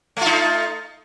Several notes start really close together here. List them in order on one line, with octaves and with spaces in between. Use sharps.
A3 F4 D#4